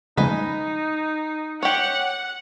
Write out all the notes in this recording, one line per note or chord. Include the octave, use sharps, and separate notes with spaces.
C#3 F3 G#3 D#4 B4 D#5 G#5
G4 C#5 F#5